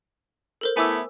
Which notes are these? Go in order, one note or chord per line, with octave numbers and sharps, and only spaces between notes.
A4 A#4 C5
A3 B3 E4 G#5 D6 E6